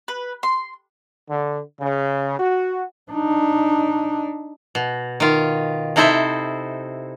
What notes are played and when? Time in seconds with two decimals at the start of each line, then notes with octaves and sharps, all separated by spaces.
0.08 B4
0.43 C6
1.29 D3
1.80 C#3
2.39 F#4
3.12 D4 D#4
4.75 B2
5.20 D#3 F4
5.96 C3 D#4 E4 A4 C5 E5